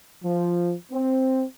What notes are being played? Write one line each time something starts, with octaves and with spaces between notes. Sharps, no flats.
F3
C4